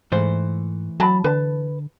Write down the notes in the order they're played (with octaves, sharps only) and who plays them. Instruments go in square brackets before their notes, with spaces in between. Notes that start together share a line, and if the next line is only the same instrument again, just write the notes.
[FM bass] G#2 [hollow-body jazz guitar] E3 A3 C5
[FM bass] F#3 [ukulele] A5 B5
[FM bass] D3 [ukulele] B4 A5